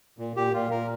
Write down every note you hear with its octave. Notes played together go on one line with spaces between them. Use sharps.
A#2
A#2 G4
A#2 F4
A#2 A#4